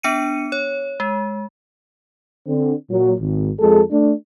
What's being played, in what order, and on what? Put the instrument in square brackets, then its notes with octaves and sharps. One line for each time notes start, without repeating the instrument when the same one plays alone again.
[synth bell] B3 D4 C#7 D#7
C#5
G#3
[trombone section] D3 C4
A#2 F#3
G#1
F2 G#3 G#4 A4
A3 D4